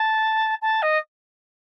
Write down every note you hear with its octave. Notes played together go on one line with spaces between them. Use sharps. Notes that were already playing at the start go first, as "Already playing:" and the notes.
Already playing: A5
A5
D#5